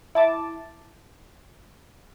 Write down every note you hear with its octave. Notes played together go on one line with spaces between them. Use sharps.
E4 A5 D6